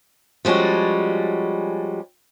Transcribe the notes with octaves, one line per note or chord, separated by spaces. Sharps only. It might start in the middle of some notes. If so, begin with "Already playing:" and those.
F3 G3 G#3 C#4 F#4